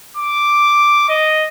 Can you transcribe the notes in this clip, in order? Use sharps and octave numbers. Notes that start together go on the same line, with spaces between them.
D6
D#5